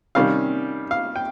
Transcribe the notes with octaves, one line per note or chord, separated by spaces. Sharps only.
C3 D#3 G3 C#4 F5
F5
G5